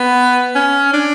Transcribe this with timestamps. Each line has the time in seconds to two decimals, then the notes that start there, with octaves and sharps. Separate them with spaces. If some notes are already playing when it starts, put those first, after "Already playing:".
Already playing: B3
0.55 C#4
0.93 D4